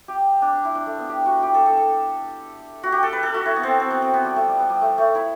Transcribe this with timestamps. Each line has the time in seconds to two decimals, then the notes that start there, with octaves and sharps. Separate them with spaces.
0.08 G4
0.42 D4
0.53 D4
0.65 E4
0.75 D4
0.86 A3
0.99 B3
1.09 G4
1.26 F#4
1.43 G4
1.54 A4
1.66 A4
1.77 A4
2.83 F#4
2.92 G4
3.03 A4
3.13 B4
3.23 A4
3.34 F#4
3.46 E4
3.56 B3
3.63 C4
3.80 C4
3.91 B3
4.02 C4
4.14 B3
4.25 G3
4.36 A3
4.48 G3
4.59 B3
4.70 G3
4.82 A3
4.98 A3
5.15 E4